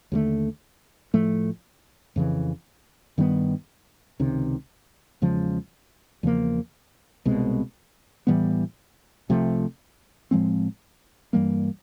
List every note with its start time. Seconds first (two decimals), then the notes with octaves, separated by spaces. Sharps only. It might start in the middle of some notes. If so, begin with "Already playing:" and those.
0.12 D#2 D3 F3 A3
1.14 A2 F3 A3
2.16 F2 C#3 E3
3.18 G2 D#3 G3 B3
4.20 C#2 C3 D#3
5.22 E2 C#3 F3 G#3
6.23 E2 C#3 F3 A#3
7.25 C2 B2 G#3 C4
8.27 A2 E3 G3 B3
9.29 C2 C3 F3 A3
10.31 A2 F3 G#3 C4
11.33 G2 E3 G3 A#3